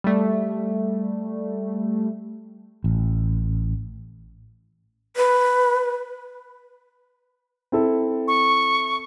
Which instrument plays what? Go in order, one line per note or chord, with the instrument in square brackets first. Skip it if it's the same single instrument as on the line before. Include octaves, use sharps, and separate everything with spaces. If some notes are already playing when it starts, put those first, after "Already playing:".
[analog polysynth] G3 A3
[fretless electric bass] A1
[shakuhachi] B4
[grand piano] C4 E4 A4
[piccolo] C#6